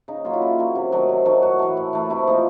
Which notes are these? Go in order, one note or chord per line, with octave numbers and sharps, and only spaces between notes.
C#3 D#4
F#3 A#3 F4
E4
C#3 F4
F#3 A#3
C3
D#3 F#3 A3
C3
D#3 F#3 A3
A2 F#4
E3 A3
A2
E3 A3
C3 E4
F3 A#3 D#4